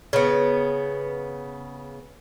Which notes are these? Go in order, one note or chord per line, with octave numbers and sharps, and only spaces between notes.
C#3 B3